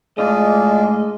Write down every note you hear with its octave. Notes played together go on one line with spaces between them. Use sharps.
A2 G#3 D4 F4 D#5